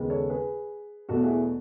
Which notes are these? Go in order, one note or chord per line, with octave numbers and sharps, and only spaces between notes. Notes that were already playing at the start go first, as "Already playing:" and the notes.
Already playing: D#2 C#3 G#3 B3
A4 C#5
G#4 B4
E2 B2 A3 F#4 A4
E4 G#4